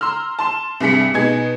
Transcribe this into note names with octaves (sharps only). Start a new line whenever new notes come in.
A#5 C6 E6 F6
A5 C6 E7
C2 G2 G#4 B6 C#7
B2 D#4 G#4 G#6